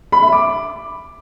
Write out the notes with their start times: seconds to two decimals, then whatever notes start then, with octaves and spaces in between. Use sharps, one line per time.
0.12 B5
0.22 E5
0.33 D6